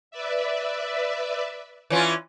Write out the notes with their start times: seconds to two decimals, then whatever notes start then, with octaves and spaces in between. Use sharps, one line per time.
0.11 B4 D5 E5
1.90 E3 C#4 F4